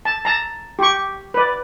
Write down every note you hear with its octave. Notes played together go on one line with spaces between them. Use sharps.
A5
A5 A#5
G4 C#6
B4 D5